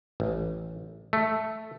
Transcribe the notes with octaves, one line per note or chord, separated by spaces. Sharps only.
A1
A3